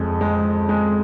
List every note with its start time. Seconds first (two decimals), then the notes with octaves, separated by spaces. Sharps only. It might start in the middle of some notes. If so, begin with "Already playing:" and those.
Already playing: F2 G#3
0.21 G#3
0.69 G#3